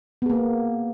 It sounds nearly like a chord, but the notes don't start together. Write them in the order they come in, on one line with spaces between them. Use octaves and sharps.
B3 G#4 A#3